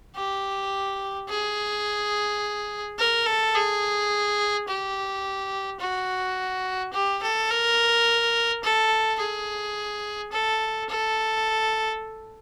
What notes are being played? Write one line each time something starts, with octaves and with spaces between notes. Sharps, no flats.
G4
G#4
A#4
A4
G#4
G4
F#4
G4
A4
A#4
A4
G#4
A4
A4